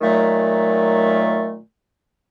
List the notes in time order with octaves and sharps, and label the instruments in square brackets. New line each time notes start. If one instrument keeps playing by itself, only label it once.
[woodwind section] A#2 D#3 F#3 A3